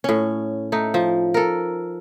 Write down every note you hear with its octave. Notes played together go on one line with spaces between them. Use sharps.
A2 C#4
A3 D#4
F3
A4 A#4